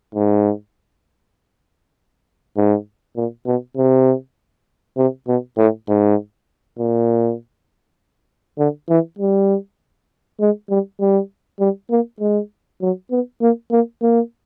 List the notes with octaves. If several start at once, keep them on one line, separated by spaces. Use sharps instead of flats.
G#2
G#2
A#2
B2
C3
C3
B2
A2
G#2
A#2
D3
E3
G3
G#3
G3
G3
G3
A#3
G#3
F#3
B3
A#3
A#3
A#3